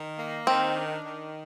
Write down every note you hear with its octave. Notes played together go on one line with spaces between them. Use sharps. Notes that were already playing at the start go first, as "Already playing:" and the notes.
Already playing: D#3
A#3
D#3 C4
D4
D#3